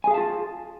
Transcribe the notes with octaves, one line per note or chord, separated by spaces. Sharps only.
F4 G#4 F5 G#5 A5